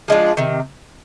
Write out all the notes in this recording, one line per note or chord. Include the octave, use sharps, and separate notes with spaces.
F3 G#3 D4 F4
C3 D#3